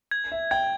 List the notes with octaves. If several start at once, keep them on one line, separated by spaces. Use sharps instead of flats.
G#6
E5
G5 G#6